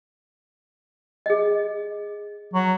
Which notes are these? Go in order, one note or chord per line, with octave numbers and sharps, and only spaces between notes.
G#4 D#5
F#3